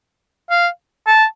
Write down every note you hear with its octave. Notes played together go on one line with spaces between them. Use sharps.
F5
A5